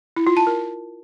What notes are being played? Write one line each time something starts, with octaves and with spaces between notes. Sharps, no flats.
E4
F4
A5
A#4